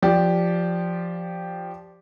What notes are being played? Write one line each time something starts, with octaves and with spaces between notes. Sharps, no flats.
F3 G4 D5